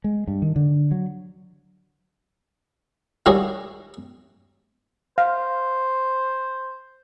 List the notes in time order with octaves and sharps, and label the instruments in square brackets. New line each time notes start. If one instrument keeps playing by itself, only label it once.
[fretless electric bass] G#3
G2
D#3
D3
F#3
[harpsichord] D#3 G3 E4 F#4 G#4 C#5
[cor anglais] C5 [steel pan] F5